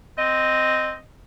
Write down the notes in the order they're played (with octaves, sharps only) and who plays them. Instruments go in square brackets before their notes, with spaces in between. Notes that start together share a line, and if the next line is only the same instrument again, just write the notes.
[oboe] C4 [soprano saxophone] D#5